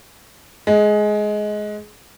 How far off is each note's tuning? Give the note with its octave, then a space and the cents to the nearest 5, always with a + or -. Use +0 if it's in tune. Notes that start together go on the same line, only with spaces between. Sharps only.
G#3 +15